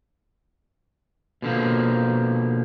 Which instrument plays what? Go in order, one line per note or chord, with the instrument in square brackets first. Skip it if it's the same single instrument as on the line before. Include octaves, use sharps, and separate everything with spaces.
[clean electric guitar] B2 D3 F3 A#3